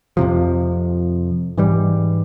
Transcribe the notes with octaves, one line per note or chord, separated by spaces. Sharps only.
F2 C3 F3
G#2 E3 G3